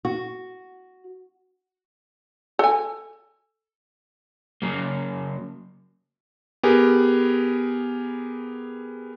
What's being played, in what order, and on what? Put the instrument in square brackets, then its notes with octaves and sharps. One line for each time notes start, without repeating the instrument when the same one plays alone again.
[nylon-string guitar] F#4
[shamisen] A4 G#5
[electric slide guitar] C#3 F#3 A#3
[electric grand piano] B3 G4 G#4 A#4